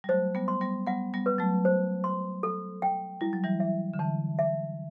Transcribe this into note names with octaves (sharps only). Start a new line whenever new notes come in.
G3
F#3 A3 C5
G3 B3
C6
G3 B3
G3 B3 F#5
G3 B3
B4
F#3 A3
C5
C6
A4
G5
G3 E4
F#3
E3 G3
E5
D3
E3 A5
E5